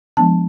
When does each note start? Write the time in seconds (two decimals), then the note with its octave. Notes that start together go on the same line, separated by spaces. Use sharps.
0.17 F3 G#3 B3 D4 A5